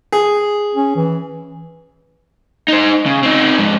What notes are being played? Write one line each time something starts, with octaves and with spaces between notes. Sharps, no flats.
G#4
C#4
E3
D#4 C5
C#3
C4 D#4
G#2 F3